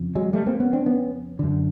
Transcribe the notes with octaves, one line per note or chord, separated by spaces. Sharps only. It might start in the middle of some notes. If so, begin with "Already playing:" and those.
Already playing: F2 C#3
F#3 G#3
G3 A3
A#3 C4
B3 C#4
C4 D4
B3 C#4
F#2 D3